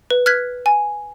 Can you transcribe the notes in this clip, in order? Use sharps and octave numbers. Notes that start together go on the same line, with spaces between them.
B4
F6 F#6 G#6 B6
G#5